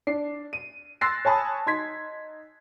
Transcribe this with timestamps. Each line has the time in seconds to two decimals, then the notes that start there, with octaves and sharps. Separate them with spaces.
0.07 D4 C7
0.53 D#7
1.01 C6 E6 F#6 A6 A#6 C7
1.25 C#5 G#5 A5 B5 D#6
1.66 D#4 C6 G#6 B6